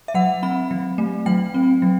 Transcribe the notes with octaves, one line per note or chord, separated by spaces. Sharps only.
E5
F#3 F#5
C4 B5
F#3
A3
F#3 G5
C4
F#3